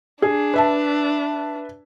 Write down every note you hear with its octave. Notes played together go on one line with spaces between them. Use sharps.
D4 G#4
B4 E5 A5